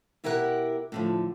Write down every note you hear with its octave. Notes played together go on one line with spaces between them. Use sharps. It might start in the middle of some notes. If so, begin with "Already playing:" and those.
B2 E4 G4 A#4 B4 F#5
A2 D3 F3